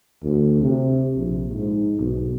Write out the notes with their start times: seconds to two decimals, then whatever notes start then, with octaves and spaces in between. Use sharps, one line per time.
0.23 D2
0.62 C3
1.17 A#1
1.52 G#2
1.99 B1